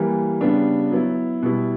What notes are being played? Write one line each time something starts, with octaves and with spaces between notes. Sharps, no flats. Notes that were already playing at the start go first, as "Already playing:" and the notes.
Already playing: E3 G3 A#3
C#3 G3 B3 D4
F#3 B3 E4
B2 G3 B3 E4